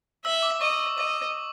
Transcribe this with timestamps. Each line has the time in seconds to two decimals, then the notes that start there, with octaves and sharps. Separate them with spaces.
0.25 E5 E6
0.43 D6
0.61 D#5 C#6
0.79 C#6
0.98 D#5 D6